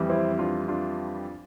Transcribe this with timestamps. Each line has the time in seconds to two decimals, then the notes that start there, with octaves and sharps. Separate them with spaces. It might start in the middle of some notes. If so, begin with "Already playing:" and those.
Already playing: F2 E3 G3
0.09 C4 E4
0.39 D4 F4
0.68 D4 F4